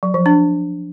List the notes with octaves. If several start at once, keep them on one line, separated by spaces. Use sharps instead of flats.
F#3
F3
D4